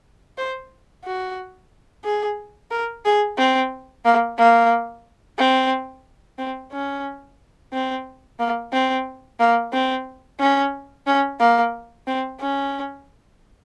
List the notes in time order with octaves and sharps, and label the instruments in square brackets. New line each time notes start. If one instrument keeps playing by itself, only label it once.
[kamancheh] C5
F#4
G#4
A#4
G#4
C4
A#3
A#3
C4
C4
C#4
C4
A#3
C4
A#3
C4
C#4
C#4
A#3
C4
C#4